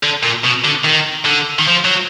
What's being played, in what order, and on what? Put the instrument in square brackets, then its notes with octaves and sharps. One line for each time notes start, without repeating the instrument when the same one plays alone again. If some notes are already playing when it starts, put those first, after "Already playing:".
[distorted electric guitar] D3
A#2
B2
D3
D#3
D3
D#3
F3
F#3